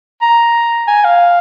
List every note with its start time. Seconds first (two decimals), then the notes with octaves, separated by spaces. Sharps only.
0.22 A#5
0.88 G#5
1.05 F5